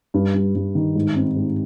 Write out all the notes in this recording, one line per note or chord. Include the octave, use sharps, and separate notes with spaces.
G2
G2
G2
D#3
G#2
C4
G#2